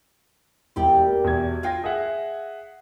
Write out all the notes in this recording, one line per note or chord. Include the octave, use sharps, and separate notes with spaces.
E1 E4 G4 D5 G5
A#3
E2 B2 G#6
F4 F5 G5 G#5 A#6
G#4 E5 F#5